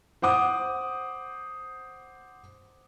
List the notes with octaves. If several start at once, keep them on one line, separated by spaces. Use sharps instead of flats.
C5 F#5 D6 D#6